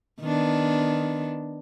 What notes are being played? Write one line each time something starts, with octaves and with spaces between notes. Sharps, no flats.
D#3 B3 D4